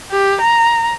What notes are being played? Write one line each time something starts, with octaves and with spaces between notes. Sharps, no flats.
G4
A#5